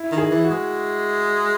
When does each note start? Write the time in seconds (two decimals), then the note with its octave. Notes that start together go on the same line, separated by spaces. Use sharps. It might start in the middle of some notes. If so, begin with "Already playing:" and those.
Already playing: E4
0.12 D#3
0.18 G#4
0.31 E3
0.44 F#4
0.51 G#3